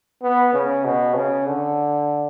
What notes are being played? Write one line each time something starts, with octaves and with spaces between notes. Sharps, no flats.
B3
C#3
B2
C#3
D3